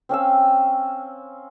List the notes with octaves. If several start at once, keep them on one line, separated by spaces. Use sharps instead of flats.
C4 C#4 F5 E6